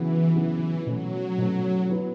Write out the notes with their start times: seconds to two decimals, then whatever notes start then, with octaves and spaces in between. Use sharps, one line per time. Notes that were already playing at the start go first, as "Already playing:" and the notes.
Already playing: C#3 E3 F#3 B3
0.35 C#3 E3 F#3 B3
0.86 B2 F#3 A3 C#4
1.38 B2 A3 C#4
1.89 F#3 B3 E4 B4